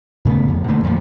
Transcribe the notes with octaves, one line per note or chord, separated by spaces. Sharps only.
A#2 C#3 A3 B3
F2 D3
B2 D3 A3 A#3
F2 A#2 D#3 F3